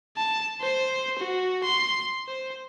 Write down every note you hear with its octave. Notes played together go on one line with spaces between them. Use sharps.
A5
C5
F#4
C6
C5